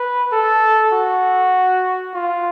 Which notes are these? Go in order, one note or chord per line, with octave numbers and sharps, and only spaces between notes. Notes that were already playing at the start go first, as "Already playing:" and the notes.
Already playing: B4
A4
F#4
F4